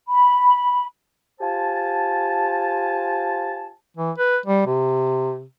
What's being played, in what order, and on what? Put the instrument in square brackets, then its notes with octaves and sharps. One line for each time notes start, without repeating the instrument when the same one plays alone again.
[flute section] B5
[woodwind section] F4 G4 C5 G#5 A5
[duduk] E3
B4
G3
C3